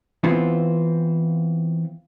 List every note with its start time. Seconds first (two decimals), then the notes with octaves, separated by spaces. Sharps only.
0.24 E3 B3 C4 F4